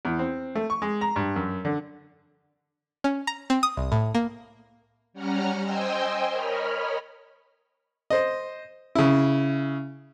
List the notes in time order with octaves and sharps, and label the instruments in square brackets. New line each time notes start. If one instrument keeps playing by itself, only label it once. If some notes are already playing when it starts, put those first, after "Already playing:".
[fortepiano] E2
C4
A3
C#6
G#3
A#5
G2
F#2
D3
[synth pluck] C#4
A#5
C4
D#6
C2
A2
A#3
[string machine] G3 C#4 F#5 A#5 F6
C5 D#5 G5 G#5 C6 E6
A#4 C#5 D#5 B5 F6
[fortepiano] C5 D#5
C#3 E4